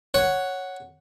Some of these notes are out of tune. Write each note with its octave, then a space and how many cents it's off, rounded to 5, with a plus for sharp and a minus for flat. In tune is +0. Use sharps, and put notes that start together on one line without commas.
C#5 +0 F#5 +0